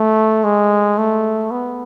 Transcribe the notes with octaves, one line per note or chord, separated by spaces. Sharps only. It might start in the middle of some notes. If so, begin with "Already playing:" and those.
Already playing: A3
G#3
A3
B3